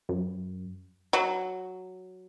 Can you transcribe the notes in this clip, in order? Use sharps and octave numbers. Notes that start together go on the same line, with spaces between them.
F#2
F#3